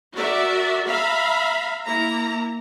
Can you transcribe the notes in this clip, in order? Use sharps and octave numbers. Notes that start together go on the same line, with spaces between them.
F#4 A#4 D5 E5
E5 F5 A#5 B5
A#3 E4 A#5